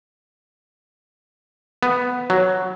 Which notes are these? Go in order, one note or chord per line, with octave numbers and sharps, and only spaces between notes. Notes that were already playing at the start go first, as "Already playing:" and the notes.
B3
F#3